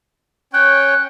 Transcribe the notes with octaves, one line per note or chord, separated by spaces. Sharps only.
C#4 C#5 G5 F#6